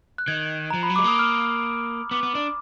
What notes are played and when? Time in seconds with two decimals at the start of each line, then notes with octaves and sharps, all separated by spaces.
0.18 F#6
0.28 D#3 G#6
0.70 F3 A#5
0.83 B5
0.90 F#3
0.96 G#3 D6
1.04 A#3 D#6
1.19 F6
2.11 B3 D6
2.23 B3
2.35 D4